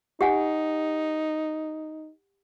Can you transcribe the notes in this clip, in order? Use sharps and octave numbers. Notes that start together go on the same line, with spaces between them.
D#4 G4 F#5 G#5